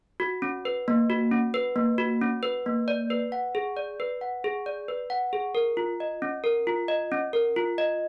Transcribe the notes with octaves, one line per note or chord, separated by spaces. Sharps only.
F#4
C#4
B4
A#3
F#4
C#4
B4
A#3
F#4
C#4
B4
A#3
D5
B4
F#5
G#4
D5
B4
F#5
G#4
D5
B4
F#5
G#4
A#4
F4
D#5
C#4
A#4
F4
D#5
C#4
A#4
F4
D#5